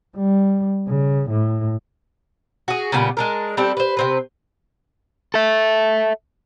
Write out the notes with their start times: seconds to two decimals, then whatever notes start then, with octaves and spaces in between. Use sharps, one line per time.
0.16 G3
0.88 C#3
1.30 A2
2.68 F#4 G#4
2.92 A#2 C#3 G3 B3
3.17 G#3 D4 A#4
3.57 G3 A3 C4 D4
3.77 B4 C5
3.97 C3 C4 B4
5.34 A4 E5